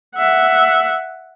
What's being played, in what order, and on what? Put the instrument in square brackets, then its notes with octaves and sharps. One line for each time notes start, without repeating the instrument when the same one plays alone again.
[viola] E5 F#5